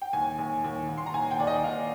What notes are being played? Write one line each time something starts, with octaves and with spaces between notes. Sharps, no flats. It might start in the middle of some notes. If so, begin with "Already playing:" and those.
G5
D#2 G#5
D#2
D#2
D#2
C6
A#5
D#2 G#5
G5
D#2 D5
D#5
D#2 F5